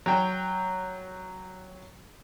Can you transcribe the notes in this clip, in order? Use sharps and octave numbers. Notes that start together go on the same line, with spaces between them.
F#3 G5